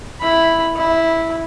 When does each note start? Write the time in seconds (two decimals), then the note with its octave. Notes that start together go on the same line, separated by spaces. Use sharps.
0.21 E4 B5
0.76 E4